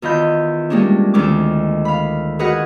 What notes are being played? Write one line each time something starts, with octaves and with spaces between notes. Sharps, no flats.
E2 D#3 F4 D#5 B5 G6
G3 G#3 A#3 C#4 D4
D2 D#3 G#3 C4 D4 D6
F5 B5
F#4 G#4 A#4 B4 D#5 F#5